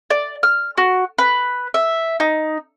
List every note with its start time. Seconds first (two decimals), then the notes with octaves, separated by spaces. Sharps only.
0.10 D5
0.43 F6
0.77 F#4
1.18 B4
1.74 E5
2.20 D#4